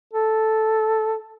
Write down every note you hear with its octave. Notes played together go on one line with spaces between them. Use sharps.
A4